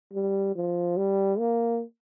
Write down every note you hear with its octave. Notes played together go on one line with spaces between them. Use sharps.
G3
F3
G3
A#3